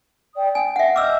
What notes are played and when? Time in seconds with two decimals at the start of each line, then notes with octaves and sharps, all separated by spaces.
0.35 D5 G5 D#6
0.55 G5 G#5
0.76 E5 F#5
0.96 D#5 D6 E6 F6 G6